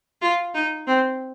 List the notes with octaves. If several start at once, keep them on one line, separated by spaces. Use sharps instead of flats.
F4
D#4
C4